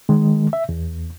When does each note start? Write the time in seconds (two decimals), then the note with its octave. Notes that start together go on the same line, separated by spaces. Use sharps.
0.09 D#3 G#3
0.53 E5
0.69 E2